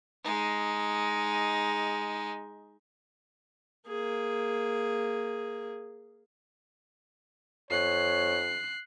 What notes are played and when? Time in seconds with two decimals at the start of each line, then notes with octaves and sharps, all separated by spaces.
0.24 G#3 D#4
3.87 A#3 G#4
7.71 F2 C#5 F#6 C7